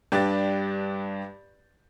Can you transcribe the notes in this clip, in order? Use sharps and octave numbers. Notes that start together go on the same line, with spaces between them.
G2 D4 G4 B4 A6